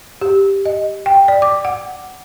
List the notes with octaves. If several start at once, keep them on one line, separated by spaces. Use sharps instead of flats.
G4
D#5
G5
D5
D6
F#5